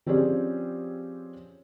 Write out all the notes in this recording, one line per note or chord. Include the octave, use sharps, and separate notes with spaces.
F3 C4 C#4 G4 G#4 D5